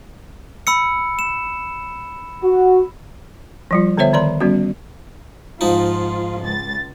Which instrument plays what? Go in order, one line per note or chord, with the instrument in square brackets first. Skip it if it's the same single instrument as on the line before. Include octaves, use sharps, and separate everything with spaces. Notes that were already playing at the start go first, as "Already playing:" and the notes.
[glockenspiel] B5 E6 C#7
E7
[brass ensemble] F#4
[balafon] F3 G3 F4
D3 B3 C5 C#5 E5
D#3 D5 A#5 C6
G3 B3 C#4 F#4
[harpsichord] G#2 F3 D#4 [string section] F4
[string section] C#2 A6